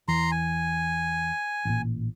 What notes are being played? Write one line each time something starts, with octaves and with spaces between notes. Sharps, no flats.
E2 E3 A#5 C6
G#5
A1 A#2